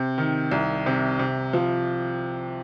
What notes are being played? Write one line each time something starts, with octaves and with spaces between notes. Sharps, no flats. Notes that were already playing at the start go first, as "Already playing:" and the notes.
Already playing: C3
D#3
C2
C3
C3
F3